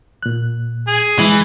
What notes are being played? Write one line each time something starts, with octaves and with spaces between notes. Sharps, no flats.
A#2 F#6
G#4
E3 G#3 E4